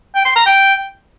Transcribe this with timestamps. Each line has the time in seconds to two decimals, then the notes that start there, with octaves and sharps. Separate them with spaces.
0.15 G5
0.26 C6
0.36 A#5
0.47 G5